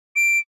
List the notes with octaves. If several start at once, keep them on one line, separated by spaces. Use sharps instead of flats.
D7